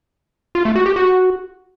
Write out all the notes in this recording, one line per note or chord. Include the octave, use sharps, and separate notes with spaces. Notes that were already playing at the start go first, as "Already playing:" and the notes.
F4
A3
F#4
G4
F#4